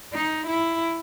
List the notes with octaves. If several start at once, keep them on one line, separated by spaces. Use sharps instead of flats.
D#4
E4